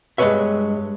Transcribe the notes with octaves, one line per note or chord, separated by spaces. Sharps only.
G2 G#3 G4 B4 C#5 E5